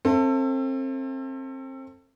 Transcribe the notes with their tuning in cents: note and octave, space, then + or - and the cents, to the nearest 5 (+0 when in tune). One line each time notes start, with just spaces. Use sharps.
C4 +30 A4 +25 E5 +25